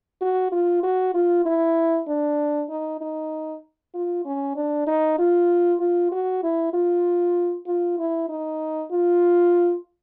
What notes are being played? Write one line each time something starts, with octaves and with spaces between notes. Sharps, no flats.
F#4
F4
F#4
F4
E4
D4
D#4
D#4
F4
C#4
D4
D#4
F4
F4
F#4
E4
F4
F4
E4
D#4
F4